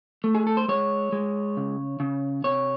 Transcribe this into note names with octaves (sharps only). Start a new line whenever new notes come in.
A3
G#4
A4
C5
G#3 C#5
G#3
C#3
C#3
C3 C#5